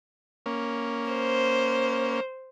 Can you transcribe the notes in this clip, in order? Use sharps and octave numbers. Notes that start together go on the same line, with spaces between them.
A#3 C#4
C5